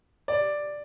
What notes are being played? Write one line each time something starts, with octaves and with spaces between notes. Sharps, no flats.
D5